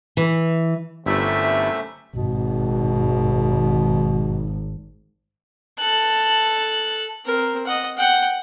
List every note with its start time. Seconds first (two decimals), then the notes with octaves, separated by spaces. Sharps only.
0.17 E3
1.06 G1 F#2 C3 A3 E4 E5
2.15 G#1 B2
5.79 A4 F#6
7.26 C4 A#4
7.67 D#5 F#5
7.96 F#5 G5